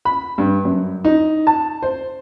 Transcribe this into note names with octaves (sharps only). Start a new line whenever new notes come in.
B5
G2
F#2
D#4
A5
C5